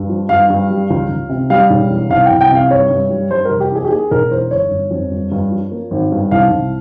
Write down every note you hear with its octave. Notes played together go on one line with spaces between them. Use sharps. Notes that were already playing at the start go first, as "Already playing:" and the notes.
Already playing: G2
F3
G2 F5
G2
G3
C#2
C#2
C3
G3 F5
E1
E2
C2 F5
C2 G5
G5
C3 F5
G2 C#5
G2
G3
G3 C5
A#4
F1
G4
E2 G#4
G4
A#3 G#4
E1 A#4
E2 C5
G1 C#5
G1
F2
G2
G2
F3
A#3
G#1
G2
C2 F5
C2